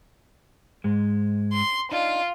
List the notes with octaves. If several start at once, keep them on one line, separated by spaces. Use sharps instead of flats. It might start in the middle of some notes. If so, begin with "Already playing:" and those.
G#2 G#3
C6
D4 D#4 F4